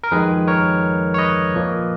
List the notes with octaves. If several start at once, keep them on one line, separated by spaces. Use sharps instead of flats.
A#4
F2 D#3 G#3 G#4 B4
A#4 C#5
C#5
B4 D#5
A#2 F3 A#3